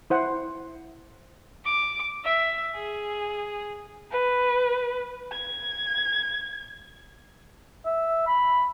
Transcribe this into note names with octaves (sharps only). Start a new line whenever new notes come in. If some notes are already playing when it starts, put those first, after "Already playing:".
E4 C5 F#5
D6
E5
G#4
B4
G#6
E5
B5